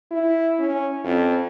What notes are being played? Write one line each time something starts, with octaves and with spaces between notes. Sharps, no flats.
E4
C#4
F2